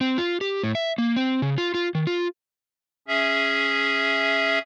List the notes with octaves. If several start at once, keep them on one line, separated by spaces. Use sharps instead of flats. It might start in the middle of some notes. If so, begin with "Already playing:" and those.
C4
F4
G4
A2
E5
A#3
C4
C#3
F4
F4
D#3
F4
C#4 G#4 E5